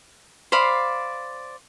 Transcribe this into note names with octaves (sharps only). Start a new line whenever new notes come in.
C5 D5 F5 B5